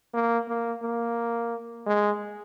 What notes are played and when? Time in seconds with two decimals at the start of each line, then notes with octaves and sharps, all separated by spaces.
0.14 A#3
0.48 A#3
0.83 A#3
1.86 G#3